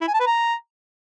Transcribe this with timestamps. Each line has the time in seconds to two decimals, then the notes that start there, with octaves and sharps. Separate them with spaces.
0.01 E4
0.08 G#5
0.14 A5
0.20 B4
0.26 A#5